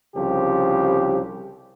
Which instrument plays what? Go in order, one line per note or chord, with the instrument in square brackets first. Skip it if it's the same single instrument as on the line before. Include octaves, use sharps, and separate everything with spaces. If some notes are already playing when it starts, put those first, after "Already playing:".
[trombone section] C2 C#3 F3 G4